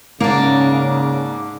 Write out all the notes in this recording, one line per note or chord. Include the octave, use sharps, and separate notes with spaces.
G#2 C#3 A#3 D4